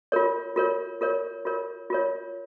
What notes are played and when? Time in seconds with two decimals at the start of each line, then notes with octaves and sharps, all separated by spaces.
0.12 F4 A#4 C#5
0.56 F4 A#4 C#5
1.01 F4 A#4 C#5
1.45 F4 A#4 C#5
1.90 F4 A#4 C#5